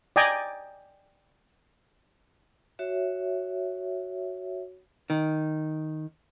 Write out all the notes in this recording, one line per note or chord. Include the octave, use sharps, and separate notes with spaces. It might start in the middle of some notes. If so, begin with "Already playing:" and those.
D5 D#5 G5 G#5 A#5
F#4 C#5 E5
D#3